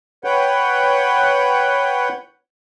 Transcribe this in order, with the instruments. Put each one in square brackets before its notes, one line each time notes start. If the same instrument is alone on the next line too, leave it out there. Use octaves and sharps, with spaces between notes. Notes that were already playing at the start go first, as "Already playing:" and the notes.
[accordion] B4 C#5 F#5 G5